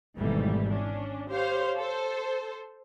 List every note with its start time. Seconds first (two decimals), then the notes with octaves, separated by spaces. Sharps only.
0.17 G#1 G#2 B2 E3 G3 A3
0.68 C#4 D4
1.29 G4 C5 C#5 F5
1.77 A4 C5